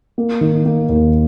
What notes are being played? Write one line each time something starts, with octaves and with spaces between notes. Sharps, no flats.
A#3
D#3
A#3
D#2